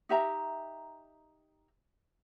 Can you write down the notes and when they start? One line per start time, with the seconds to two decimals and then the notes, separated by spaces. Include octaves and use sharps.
0.09 D#4 G4 E5 A#5